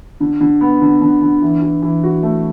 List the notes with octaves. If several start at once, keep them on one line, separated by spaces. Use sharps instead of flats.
D3
D3
B3
D3
D3
D3
E3
E3
E3
F#4
A3